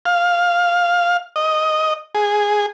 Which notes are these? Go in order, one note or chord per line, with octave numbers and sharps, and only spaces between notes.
F5
D#5
G#4